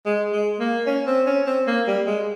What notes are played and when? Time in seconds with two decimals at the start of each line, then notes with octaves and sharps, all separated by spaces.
0.06 G#3
0.32 G#3
0.59 A#3
0.86 C#4
1.07 C4
1.27 C#4
1.46 C4
1.67 A#3
1.87 G3
2.07 G#3